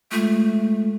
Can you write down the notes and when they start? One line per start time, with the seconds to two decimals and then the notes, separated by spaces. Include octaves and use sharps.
0.12 G#3 A3 F4 A4